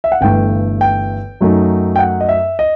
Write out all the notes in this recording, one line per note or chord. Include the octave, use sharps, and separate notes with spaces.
E5
F#5
G1 G2 E3 A3 G5
G5
F#2 F#3 A3 D#4
G5
F#5
D#5
E5
D#5